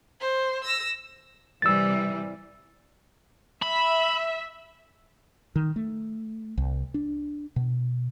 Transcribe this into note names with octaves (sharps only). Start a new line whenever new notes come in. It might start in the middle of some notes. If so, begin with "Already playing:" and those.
C5
E6 A#6
C3 E3 G3 E6 A6
E5 B5
D#3
A3
C2
D4
B2